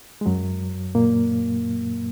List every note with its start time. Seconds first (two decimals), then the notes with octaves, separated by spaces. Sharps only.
0.21 G#3
0.26 F#2 F#3
0.95 A#2 A#3